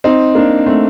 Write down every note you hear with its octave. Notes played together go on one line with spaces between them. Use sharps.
C4 D#4
A#3 D4
A3 C4